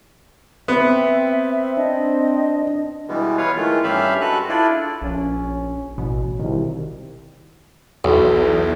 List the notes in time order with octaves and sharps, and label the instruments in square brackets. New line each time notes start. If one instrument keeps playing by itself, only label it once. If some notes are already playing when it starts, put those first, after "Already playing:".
[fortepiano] B3 [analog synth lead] C4 [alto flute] E5
[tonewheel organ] D4 [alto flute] D#5
[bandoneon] B2 E3 G3 G#3 B3
B3 B4 C#5 F5
D#3 E3 G#3 A3 F4
G2 C#4 G4 E5 F5 B5
G#3 F#4 A4 B4 F#6
D4 E4 F4 A4 D5
[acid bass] A#1 [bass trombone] C#4
[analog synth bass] A1 [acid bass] B2
[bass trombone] C2 [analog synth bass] D#3
[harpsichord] B1 [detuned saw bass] E2